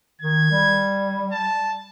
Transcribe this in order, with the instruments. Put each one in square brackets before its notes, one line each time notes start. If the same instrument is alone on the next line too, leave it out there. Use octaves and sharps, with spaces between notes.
[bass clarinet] D#3 [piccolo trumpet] G#6
[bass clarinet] G3
[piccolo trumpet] A5